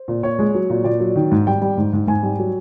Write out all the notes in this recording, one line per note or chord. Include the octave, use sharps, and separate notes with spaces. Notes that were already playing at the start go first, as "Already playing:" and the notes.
Already playing: C5
A#2
A#2 C#5
G#3
F#3
A#2
A#2 D5
F#3
D#3
G#2
G3 G5
G3
G#2
G#2
G#2 G#5
G3
F#3